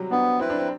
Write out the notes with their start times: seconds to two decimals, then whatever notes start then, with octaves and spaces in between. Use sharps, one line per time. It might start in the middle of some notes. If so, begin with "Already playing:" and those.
Already playing: C3 F#3 G3
0.11 B3 D4
0.40 C4 E4 B4
0.50 D4
0.59 C4